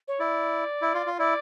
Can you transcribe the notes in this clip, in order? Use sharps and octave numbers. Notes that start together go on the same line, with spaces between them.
C#5
E4 D5
E4
F4
F4
E4 D5